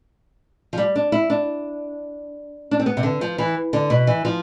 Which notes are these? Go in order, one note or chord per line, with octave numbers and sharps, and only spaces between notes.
F3
G3
D4
E4
D4
D4
C4
B3
C3
D3
F3
E3
D3
B2
E3
F3